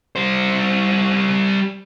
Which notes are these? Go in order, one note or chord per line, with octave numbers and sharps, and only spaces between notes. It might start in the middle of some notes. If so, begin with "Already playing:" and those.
G3 C5